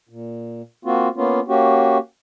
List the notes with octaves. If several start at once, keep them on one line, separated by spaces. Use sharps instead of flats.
A#2
A#3 C4 F4 F#4
A#3 B3 C#4 F4
A#3 C#4 F#4 G4